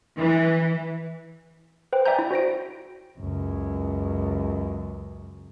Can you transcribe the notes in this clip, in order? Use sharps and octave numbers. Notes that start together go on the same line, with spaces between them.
E3
B4 C5 G5
D5 E5 G5 G#5 A#5 G6
E4
F#4 C5 A#6 D7
C#2 F#2